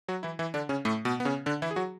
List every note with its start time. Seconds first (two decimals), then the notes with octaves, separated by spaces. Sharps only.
0.08 F#3 F#4
0.23 E3 E4
0.39 E3 E4
0.54 D3 D4
0.69 C#3 C#4
0.85 A2 A3
1.05 B2 B3
1.20 B3
1.25 C#3 C#4
1.46 D3 D4
1.62 E3 E4
1.71 G#4
1.76 F#3 F#4